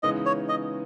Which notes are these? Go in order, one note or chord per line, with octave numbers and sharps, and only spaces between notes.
C#3 E3 G#3 B3 D#4 D#5
C#5
D#5